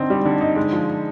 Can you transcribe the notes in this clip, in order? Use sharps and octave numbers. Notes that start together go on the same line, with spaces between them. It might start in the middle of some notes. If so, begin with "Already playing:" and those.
Already playing: D3 C4 D#4
G3
D3
D#4
G#3
F3